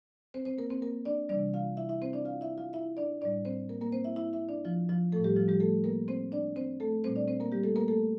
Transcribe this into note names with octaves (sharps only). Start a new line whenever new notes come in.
C4 C5
C4 C5
A#3 A#4
C4 C5
A#3 A#4
D4 D5
C3 E3 G3 D4 D5
F4 F5
E4 E5
E4 E5
C4 C5
D4 D5
F4 F5
E4 E5
F4 F5
E4 E5
D4 D5
A2 G3 D4 D5
C4 C5
A#3 A#4
A#3 A#4
C4 C5
E4 E5
E4 E5
E4 E5
D4 D5
F3 F4
F3 F4
A2 F3 A3 A4
G3 G4
F3 F4
G3 G4
A3 A4
A#3 A#4
C4 C5
D4 D5
C4 C5
A3 A4
A#2 G3 C4 C5
D4 D5
C4 C5
A#3 A#4
G3 G4
A3 A4
A#3 A#4
A3 A4